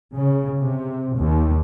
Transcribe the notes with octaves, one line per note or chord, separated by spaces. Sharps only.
C#3
C3
D#2